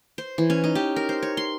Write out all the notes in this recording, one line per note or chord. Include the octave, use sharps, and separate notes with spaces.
C5
E3
C#4
D#4
G4
A#4
C5
C#5
C6